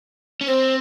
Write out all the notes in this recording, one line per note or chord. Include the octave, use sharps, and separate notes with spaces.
C#4
C4 C5